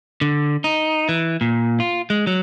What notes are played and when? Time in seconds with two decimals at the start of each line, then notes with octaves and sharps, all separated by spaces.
0.21 D3
0.64 D#4
1.09 E3
1.41 A#2
1.80 F4
2.10 G#3
2.27 F#3